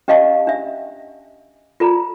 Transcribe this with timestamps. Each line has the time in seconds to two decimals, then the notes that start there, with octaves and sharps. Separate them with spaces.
0.08 C#4 G4 D#5 F5 A5 C#6
0.47 D4 E5
1.80 F4 A4 A#5